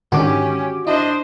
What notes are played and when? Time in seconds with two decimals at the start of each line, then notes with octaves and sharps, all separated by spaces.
0.12 G#2 D3 D#3 C#4 F#4 G4 D6
0.87 D4 E4 C5 D#5